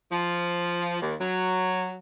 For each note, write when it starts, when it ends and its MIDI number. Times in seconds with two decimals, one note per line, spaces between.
0.09 0.98 53
1.01 1.13 39
1.18 1.95 54